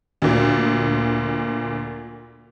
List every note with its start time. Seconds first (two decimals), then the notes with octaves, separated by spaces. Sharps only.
0.22 D2 A#2